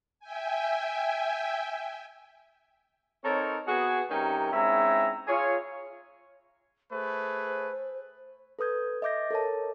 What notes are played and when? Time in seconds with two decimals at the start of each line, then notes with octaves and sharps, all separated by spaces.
0.20 E5 G5 G#5
3.24 C4 D#4 A4 A#4 C#5
3.67 B3 F#4 G#4
4.10 G2 C3 C#4 D#4 A#4 G5
4.52 G#2 C4 C#4 E4 E5 A#5
5.27 F4 G#4 C#5
6.92 A3 G#4 B4 C5
8.59 A4 B4 D#6 G6 G#6
9.02 D#5 E5 D6 G6 A#6
9.31 A4 A#4 C#5 A5